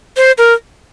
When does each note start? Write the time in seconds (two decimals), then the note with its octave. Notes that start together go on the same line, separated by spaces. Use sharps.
0.17 C5
0.38 A#4